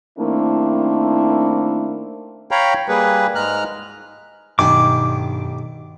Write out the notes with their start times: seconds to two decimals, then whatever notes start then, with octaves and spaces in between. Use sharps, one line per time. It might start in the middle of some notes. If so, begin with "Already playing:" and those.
0.19 D#3 A3 A#3 C4 D4 E4
2.51 C#5 F5 G5 A#5 B5
2.88 G3 A#3 G#4 B4
3.35 G#2 G#3 A#5 F6 F#6
4.59 B1 G2 D#3 G3 G#5 D6